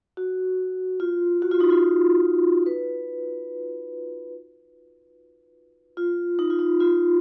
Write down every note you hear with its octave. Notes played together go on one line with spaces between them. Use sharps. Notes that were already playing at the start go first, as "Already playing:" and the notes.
F#4
F4
F#4
F4
D#4
F4
B4
F4
D#4
F4
D#4
F4